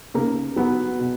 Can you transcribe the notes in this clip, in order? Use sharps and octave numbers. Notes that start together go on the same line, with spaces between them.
C#3 A#3
F#3 B3
B2